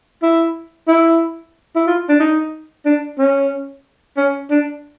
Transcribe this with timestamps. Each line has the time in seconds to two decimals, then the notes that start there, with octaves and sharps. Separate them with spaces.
0.22 E4
0.88 E4
1.76 E4
1.87 F4
2.09 D4
2.20 D#4
2.85 D4
3.18 C#4
4.17 C#4
4.50 D4